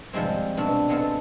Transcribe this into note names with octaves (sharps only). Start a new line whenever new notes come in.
C3 F3 G3 G#3 C4
B2 G3 C4 D4 F4
G#3 B3 C4 F4 A4